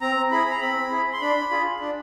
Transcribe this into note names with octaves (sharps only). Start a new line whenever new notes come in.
C4 A#5
E4 G#4 B5
A#5
C4 B5
E4 G#4
C6
D4 B5
F4 G#4
D4